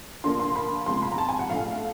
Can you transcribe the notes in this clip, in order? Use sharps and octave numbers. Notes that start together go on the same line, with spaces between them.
D3 F3 A#3 D4 C6
C6
B5
C3 F3 G#3 C6
B5
A#5
A5
G#5
F#5
A2 F3 A3 D4 F5